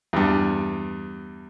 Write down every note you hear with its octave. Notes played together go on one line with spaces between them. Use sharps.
E2 G2